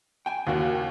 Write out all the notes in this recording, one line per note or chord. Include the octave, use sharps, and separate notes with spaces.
G5 G#5
D#2 C#3 E4 F#4